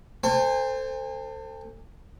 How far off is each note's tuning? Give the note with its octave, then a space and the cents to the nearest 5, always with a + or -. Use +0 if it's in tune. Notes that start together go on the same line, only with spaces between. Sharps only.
A4 +30 C5 -5 G#5 -45